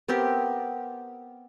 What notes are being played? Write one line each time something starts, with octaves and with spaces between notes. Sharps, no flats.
B3 C4 G4 A#4